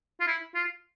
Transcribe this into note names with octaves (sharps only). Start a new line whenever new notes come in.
F4
E4
F4